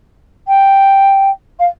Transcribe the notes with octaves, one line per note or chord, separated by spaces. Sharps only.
G5
F5